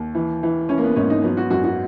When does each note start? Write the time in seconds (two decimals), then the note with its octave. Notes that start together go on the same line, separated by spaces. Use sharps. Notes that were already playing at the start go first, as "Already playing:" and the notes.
Already playing: D#2
0.15 E3
0.43 E3
0.69 E3 C#4
0.78 A#3
0.84 B3
0.96 G#2 C#4
1.10 D#4
1.23 F#3 B3
1.37 F#4
1.50 F#2 F#4
1.64 F#4